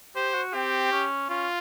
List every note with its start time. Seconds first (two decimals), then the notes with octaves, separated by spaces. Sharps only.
0.15 G4 C5
0.34 F#4
0.54 C4 G4
0.92 C#4
1.30 C#4 F4